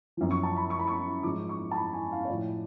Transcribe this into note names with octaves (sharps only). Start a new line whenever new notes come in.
F#2 F3
C#6
A5
B5
C#6
B5
C#6
G#2 F3 D6
C#6
A5
B5
G#5
F5
C#5
A2 F3 D5